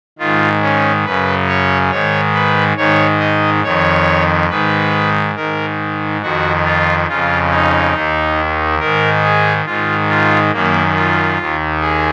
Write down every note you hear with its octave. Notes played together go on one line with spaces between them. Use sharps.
G#2 D#3 F4
C#4
F#2 C#3 B4
C#5
G#2 D#3 C#5
B4
G#2 D#3 C#5
D#5
F2 D#3 C#5
G#2 D#3 B4
G#2 D#3 A#4
F2 D#3 F#4
F4
F2 C#3 F4
D#4
D#2 D#3
G#2 D#3 A#4
G#4
G#2 D#3 F4
F4
F#2 D#3 A#3
F4
D#2 D#3
G#4